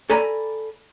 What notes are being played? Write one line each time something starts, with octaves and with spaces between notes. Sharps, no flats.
A4 D5 G#5 A#5 B5